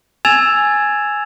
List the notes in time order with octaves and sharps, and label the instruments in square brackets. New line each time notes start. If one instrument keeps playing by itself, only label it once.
[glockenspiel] G#5 E6 G#6 A6 E7 F7